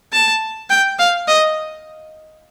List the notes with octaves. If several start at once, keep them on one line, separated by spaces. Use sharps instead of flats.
A5
G5
F5
D#5